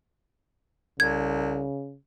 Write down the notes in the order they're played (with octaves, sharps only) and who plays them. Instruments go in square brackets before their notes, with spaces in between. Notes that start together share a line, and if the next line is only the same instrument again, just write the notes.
[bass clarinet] C2 [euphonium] C#3 [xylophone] G#6